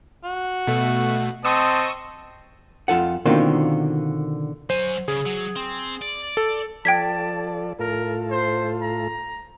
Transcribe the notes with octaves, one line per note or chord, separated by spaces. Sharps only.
F#4
B2 A3
C4 D#5 A5 C#6 D#6 E6
F2 F4 A4 F#5
B2 D3 D#3 A#3 C4 F4
F#3 C5 G#5
C#3 G#4
F#3
C4
D5
A4
F3 A4 D5 G5 A5 G#6 B6
A2 F4 A4 A#4
C5
A#5